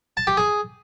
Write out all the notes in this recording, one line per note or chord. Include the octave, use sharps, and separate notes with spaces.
A5
G4
G#4